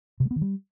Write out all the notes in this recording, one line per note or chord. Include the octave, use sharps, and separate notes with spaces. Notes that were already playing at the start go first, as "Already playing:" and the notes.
C3
G#3
B3
D#3
G3